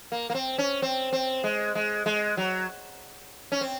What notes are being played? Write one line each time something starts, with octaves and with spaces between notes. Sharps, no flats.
A#3
A#3
C4
C#4
C4
C4
G#3
G#3
G#3
F#3
C#4
C4